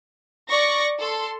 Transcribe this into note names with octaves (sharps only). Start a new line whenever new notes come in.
D5 C#6 A#6
A4 C6